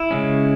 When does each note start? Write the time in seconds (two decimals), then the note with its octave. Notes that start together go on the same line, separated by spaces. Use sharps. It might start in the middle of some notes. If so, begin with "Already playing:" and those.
Already playing: E4
0.11 C#3 G#3 C#4